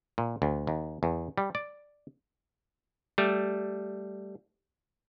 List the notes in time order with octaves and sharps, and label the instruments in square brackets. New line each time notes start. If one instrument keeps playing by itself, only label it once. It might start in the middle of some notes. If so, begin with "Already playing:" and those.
[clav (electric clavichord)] A#2
D2
D#2
E2
G3
D5
G3 A3